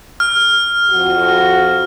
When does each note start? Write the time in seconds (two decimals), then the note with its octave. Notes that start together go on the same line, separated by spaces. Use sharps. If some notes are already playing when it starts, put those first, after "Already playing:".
0.20 F6
0.91 F2 F#4